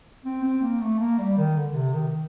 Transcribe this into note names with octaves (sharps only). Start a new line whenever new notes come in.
C4
C4
A#3
A3
A#3
G3
D#3
D3
C3
D#3
D#3